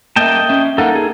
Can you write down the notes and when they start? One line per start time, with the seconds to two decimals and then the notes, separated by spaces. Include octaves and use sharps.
0.16 A#3 A#4 D#5 E5 G5 A5
0.49 C#4 E5
0.78 A#3 D#4 A4 A#4 F5 F#5
0.95 G#4